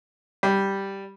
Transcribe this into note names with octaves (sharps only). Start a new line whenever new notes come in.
G3